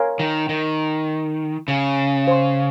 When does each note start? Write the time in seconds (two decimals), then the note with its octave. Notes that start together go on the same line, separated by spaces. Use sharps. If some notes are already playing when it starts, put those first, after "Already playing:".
Already playing: A#4 C#5 F5 G#5 C6
0.19 D#3
0.49 D#3
1.68 C#3
2.28 C5 F5 C6